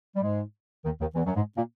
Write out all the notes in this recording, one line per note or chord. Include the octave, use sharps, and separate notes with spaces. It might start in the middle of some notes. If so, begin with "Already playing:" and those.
G3
G#2 G#3
D#2 D#3
D#2 D#3
E2 E3
F#2 F#3
G#2 G#3
A#2 A#3